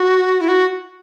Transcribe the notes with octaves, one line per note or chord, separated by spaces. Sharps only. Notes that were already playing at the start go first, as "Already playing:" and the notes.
Already playing: F#4
E4
F#4